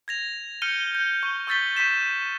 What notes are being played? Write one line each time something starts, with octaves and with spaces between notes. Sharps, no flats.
G#6 A#6 F7
F6 G6 C#7 D#7 G7
G6
C#6
C#6 E6 G6 A6 B6 G7
C#6 G6 B6 E7